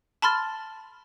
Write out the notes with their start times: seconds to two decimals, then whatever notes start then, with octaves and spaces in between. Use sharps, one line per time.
0.22 A5 B5 C6 F6 A6